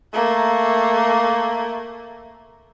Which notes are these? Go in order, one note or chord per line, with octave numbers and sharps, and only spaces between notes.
A3 A#3